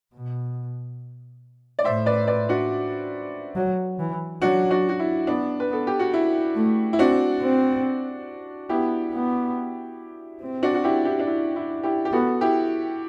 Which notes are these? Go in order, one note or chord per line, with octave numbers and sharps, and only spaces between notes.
B2
D5
A2 C5 E5
B4 D5
B4 D5
D4 F#4
F#3
E3
F#3 D4 F#4
D4 F#4
F#4
E4
B3 D4
B4
B3 A4
G4
F#4
E4
A3
E4
C4 D4 F#4
C4
B3 E4 G4
B3
C4
D4 F#4
F#4
E4 G4
E4 G4
D4
E4
E4
E4 G4
G4
B3 F#4 A4
E4 G4